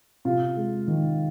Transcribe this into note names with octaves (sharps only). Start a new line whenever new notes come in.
C3 F4
G#3
D#3